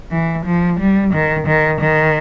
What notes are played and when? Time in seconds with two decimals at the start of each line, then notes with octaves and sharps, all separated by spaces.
0.12 E3
0.45 F3
0.80 G3
1.13 D#3
1.47 D#3
1.80 D#3